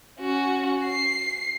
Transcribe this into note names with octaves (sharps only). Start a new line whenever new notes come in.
C#4 F#4
C7